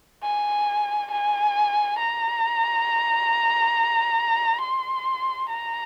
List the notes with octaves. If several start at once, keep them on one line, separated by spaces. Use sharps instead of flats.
G#5
G#5
A#5
C6
A#5